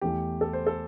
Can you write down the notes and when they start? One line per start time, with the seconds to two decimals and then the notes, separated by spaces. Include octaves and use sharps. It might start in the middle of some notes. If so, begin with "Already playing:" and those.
0.02 E2 E3 A3 G4
0.41 A4
0.53 C5
0.67 A4